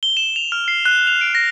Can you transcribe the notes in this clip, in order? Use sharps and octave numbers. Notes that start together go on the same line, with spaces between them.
G7
E7
F7
F6
C7
F#6
F7
D7
A#6